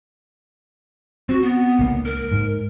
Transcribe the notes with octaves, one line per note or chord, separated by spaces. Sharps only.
C4 F#4
B3
C#2 A#3
A#4
G#2